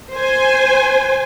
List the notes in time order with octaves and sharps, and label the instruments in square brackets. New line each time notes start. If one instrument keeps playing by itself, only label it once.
[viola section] C5 G#5